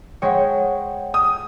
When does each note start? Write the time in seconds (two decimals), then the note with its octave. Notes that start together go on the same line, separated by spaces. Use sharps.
0.22 G#3 C5 C#5 F#5 G5
1.14 D#6